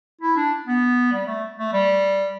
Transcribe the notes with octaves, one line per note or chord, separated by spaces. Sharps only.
E4
D4
B3
G3
A3
A3
G3